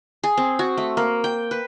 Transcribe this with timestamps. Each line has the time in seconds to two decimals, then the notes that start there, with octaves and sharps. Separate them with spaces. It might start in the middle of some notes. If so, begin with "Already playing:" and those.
0.23 G#4
0.37 C4
0.59 F#4
0.77 A3
0.97 A#3
1.24 G5
1.51 B4